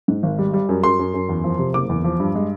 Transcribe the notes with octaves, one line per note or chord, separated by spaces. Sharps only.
G#2
G#1
G3
G3
F#2
F#2 C6
F#2
F#2
E2
F3
C3
F#1 D6
E2
F3
G2
G#3